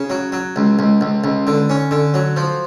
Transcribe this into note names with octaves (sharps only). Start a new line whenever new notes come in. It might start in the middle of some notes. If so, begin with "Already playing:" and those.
Already playing: C#3
F#3
F#3
C#2
C#2
C#2
C#2
D3
C#4
D3
F#3
F3